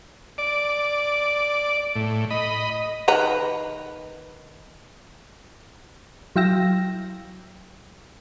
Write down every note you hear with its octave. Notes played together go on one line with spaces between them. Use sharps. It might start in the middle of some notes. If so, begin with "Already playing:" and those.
D5
A2
D#5 B5
D#3 B4 A#5
F#3 E4 F5 G5 E6 A#6